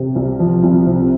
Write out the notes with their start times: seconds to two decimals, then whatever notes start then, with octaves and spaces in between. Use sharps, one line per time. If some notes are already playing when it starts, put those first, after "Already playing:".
Already playing: C3
0.15 C2
0.39 F3
0.63 C2
0.86 C3